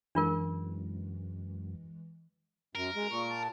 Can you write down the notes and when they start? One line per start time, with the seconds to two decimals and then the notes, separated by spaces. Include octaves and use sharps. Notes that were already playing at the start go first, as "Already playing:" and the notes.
0.15 F#2 E3 G#3 D4 F4 A#4
2.75 F#2 A#4
2.95 G#3
3.10 A#2 C#6
3.30 A5